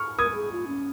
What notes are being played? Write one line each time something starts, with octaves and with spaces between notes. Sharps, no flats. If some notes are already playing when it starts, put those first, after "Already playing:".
Already playing: C#6 F6
A#4 D#6 G#6
A#4
G#4
F4
C#4